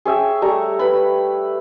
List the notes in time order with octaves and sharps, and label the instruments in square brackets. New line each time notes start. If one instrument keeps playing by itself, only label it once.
[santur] G#4 C#5 E5 G5
G3 A3 A#5
B4 B5